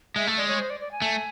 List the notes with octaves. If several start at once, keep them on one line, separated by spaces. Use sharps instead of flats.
G#3 E5
A3
G#3 D5
C#5
C5
D5
D5
G#5
A3